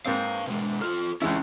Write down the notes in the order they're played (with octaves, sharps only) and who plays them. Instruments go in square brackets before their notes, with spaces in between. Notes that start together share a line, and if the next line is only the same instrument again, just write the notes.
[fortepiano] G#2 A#3 C4 [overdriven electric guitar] B4 F5
[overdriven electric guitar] B2 G#3
[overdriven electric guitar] F4 A4 [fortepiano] F6
[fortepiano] C#2 G#3 E4 [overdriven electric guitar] E3 C#4